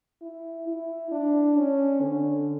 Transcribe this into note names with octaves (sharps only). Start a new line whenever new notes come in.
E4
E4
D4
C#4
D3